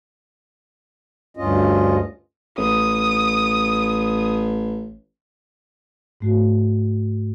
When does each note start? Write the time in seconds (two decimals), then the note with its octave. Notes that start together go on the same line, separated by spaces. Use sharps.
1.37 D2 G2 C#4 F4 D#5
2.58 A1 D#6
6.21 G#2 A3 F#4